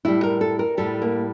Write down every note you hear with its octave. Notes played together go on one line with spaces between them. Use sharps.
A2 G3 E4
A#4
A4
A#4
A2 G3 A4
A#3